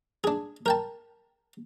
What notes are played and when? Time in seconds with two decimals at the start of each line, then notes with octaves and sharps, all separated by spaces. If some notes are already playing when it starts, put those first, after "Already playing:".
0.24 D4 G#4
0.66 A#4 G5 A5